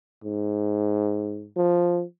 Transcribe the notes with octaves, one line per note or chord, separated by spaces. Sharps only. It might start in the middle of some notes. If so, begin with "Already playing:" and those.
G#2
F3